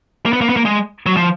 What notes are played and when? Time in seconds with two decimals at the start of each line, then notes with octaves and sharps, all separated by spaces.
0.26 A#3
0.33 B3
0.41 A#3
0.49 B3
0.56 A#3
0.65 G#3
1.06 F#3
1.17 F3